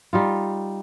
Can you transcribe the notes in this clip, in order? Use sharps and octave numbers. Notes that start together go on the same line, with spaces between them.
G3 D#4 F4